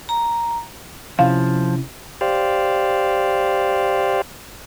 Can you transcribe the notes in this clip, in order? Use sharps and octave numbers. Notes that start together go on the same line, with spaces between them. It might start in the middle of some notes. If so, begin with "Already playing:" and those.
A#5
C3 F3 C#4 E4 F5
G4 C5 D5 F5